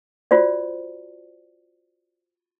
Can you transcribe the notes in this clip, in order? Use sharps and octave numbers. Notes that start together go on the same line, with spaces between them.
F4 F#4 C5 D5